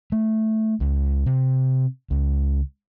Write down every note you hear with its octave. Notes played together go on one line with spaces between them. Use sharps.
A3
C#2
C3
C#2